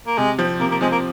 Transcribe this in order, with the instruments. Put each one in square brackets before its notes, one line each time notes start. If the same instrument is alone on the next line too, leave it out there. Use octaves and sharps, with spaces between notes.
[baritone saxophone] A#3
[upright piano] C3 [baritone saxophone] G#3
[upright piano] F3 C4
[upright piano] C3 [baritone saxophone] A#3
[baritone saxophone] A#3
[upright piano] F3 C4 [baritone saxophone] G#3
[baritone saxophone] A#3